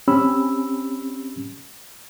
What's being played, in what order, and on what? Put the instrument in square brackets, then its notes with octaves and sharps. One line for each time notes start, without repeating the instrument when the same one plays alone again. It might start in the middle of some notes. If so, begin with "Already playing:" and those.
[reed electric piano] C4 C#4 G4 B5 E6